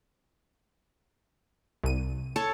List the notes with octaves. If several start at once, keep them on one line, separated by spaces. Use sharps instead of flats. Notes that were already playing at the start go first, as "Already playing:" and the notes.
C2 D#7
A4 C#5